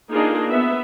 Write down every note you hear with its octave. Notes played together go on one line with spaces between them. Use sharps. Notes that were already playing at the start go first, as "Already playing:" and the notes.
A#3 D4 D#4 F4 G#4 A#4
B3 E5